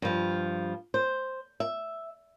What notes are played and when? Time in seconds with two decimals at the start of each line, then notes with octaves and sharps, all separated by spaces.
0.02 G2 F3
0.94 C5
1.60 E5